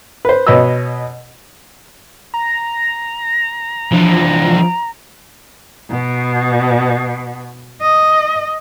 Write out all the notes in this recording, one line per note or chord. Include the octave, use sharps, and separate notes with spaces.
B4 C5
B2 B4 C#5 D#5 E6
A#5
E3 F3 D4
B2
D#5